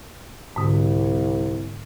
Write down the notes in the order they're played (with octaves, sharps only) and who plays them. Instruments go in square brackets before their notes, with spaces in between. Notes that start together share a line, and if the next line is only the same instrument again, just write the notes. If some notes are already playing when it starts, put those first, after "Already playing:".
[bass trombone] C2 [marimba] G#2 D3